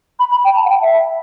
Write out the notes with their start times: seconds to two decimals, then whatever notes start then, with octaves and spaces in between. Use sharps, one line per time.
0.19 B5
0.31 B5
0.44 G5
0.56 A5
0.65 F#5
0.69 G5
0.81 E5